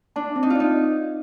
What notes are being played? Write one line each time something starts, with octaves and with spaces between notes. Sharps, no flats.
D4 A5
C4
D#4
F4
D#4 D5